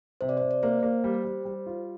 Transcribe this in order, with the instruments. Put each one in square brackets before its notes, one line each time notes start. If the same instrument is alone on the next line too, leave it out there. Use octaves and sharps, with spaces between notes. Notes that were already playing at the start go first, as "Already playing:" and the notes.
[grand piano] C3 [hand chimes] C5
[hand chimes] D5
[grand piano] C3 [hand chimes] C5
[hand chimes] D5
[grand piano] A#3 [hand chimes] C5
[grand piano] A#3
G3
G3
G3
F4